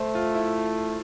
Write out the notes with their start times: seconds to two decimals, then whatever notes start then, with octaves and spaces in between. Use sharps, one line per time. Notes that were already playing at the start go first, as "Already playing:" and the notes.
Already playing: A3 C5
0.15 F4
0.34 E4